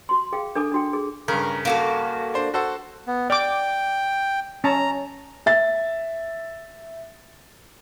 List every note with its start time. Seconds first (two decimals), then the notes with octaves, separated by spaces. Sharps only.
0.09 F#4 C6
0.32 G#4 F5 G5
0.55 D4 A4 G#5 D6
0.72 D4 F#4 G5
0.93 G#4
1.28 G2 C#3 A#4
1.65 A#3 F#4 A4
2.34 D4 C5
2.54 F#4 A4 C5
3.07 B3
3.30 D5 G5 D6
4.64 C#4 A5 A#5
5.46 E5 A6